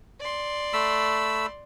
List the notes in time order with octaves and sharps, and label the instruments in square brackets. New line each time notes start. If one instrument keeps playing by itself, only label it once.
[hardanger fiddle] D5 C6
[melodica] A3 B5 E6